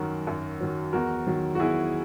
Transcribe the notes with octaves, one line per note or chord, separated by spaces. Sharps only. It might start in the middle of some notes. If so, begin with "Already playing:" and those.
Already playing: F#2 D#3 F#3 F#4 A#4
F#2
D#3 F#3
E2 F#4 A#4
D#3 F#3
F#4
E2 E4 G#4